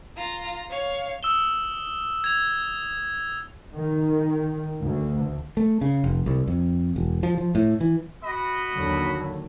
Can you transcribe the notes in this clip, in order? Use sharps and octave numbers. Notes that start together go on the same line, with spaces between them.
F4 A#5
C#5 F5
D#6 E6 E7 G7
G#6 F7
D#3
D2
A3
C#3
F1
C2
F2
E1
F3
F3
A2
E3
F#4 D#5 B5
D#2 D3 F#3